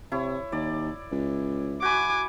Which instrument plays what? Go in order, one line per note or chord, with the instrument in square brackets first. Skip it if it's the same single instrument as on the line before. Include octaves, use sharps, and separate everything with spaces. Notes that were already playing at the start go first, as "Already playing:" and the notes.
[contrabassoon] C3 [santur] E4 C#5
[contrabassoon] D#2 [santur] D5
[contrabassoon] C#2
[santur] F#4 B5 [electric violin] G#5 D6